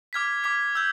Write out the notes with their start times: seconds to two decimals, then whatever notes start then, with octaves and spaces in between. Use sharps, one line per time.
0.13 D6 F6 G#6 B6
0.44 D6 F6 G#6 B6
0.75 E6 G6